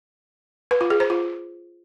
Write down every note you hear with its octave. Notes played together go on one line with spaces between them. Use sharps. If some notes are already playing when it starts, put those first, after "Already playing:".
B4
F4
G#4
C5
F4